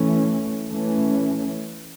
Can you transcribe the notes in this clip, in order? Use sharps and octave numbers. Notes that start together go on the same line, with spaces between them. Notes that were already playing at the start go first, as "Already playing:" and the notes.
Already playing: E3 A3 C#4
E3 A3 C#4